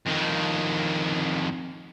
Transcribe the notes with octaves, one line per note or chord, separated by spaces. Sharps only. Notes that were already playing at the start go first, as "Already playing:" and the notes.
F2 D#3